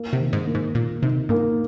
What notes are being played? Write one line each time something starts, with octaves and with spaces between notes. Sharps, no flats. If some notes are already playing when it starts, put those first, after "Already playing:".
Already playing: A#3
C3
D#3
G#2
A#3
G#2
A#2 A#3
C3 D#4
G#2 A#3